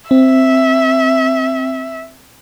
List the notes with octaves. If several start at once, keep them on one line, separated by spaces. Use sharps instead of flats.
C4 E5